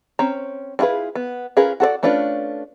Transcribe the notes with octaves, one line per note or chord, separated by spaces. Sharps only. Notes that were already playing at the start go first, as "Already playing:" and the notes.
C4 C#4 A#5
D4 E4 F4 G#4 B4
B3
C#4 F4 G#4 A#4 B4
F#4 A4 C#5 D5
A3 C#4 D4 F4 B4